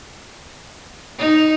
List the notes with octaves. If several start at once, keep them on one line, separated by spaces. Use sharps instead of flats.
D#4